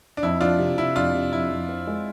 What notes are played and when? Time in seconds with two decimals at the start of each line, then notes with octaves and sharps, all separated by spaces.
0.17 D4
0.23 F2 E4
0.40 F3 D4 F4
0.59 C3
0.77 C3 E4
0.95 F2 D4 F4
1.14 C3
1.32 F2 E4
1.51 F2
1.69 C4
1.87 G#3